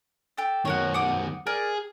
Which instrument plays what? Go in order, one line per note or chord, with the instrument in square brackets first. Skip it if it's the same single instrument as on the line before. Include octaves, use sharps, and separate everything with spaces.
[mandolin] G4 A4
[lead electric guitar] F#2 D#3 [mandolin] F#4 A#4 C#5
[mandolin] F#5 D6 D#6
[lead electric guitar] G#4 [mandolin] A#4 D5